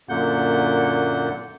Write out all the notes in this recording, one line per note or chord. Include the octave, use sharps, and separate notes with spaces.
F#2 A#2 D3 A#3 F#5 G6